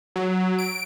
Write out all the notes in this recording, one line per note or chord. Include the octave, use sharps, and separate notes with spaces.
F#3
D7